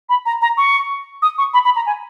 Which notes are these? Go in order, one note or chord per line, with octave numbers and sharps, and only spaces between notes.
B5
A#5
A#5
C#6
D#6
C#6
B5
B5
A#5
G#5